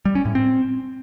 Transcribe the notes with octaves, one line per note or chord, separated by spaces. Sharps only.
G3
C#4
A2
C4